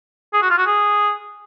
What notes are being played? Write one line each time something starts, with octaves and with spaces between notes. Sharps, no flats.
G#4
F#4
F4
F#4
G#4